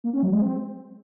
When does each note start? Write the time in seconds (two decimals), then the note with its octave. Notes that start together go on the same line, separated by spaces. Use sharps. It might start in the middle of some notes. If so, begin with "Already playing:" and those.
0.04 A#3
0.13 C#4
0.23 F#3
0.32 G#3
0.42 C4